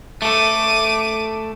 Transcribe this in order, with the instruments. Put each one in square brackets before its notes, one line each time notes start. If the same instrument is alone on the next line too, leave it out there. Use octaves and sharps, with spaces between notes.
[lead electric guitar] A3 A4 [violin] D6 D#7